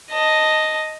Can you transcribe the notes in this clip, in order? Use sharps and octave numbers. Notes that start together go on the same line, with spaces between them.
D#5 A5